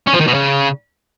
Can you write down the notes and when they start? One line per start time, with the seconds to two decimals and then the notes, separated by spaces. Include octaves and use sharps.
0.07 C#4
0.14 F3
0.20 D#3
0.27 B2
0.34 C#3